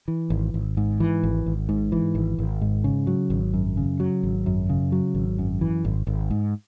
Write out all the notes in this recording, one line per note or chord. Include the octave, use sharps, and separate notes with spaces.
E3
G#1
G#1
G#2
E3
G#1
G#1
G#2
E3
G#1
G#1
G#2
C#3
F#3
G#1
F#2
C#3
F#3
G#1
F#2
C#3
F#3
G#1
F#2
E3
G#1
G#1
G#2